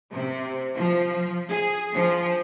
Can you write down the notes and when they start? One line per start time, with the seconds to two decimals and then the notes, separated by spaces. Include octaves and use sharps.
0.14 C3
0.75 F3
1.49 G#4
1.94 F3